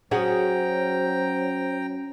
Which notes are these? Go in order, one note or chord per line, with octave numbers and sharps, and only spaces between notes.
F#3 C#4 F#4 G#4 C5 G5 A#5